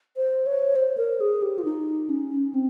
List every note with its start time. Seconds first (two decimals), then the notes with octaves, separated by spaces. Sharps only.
0.16 C5
0.46 C#5
0.75 C5
0.97 A#4
1.20 G#4
1.42 G4
1.58 F4
1.65 D#4
2.09 C#4
2.54 C4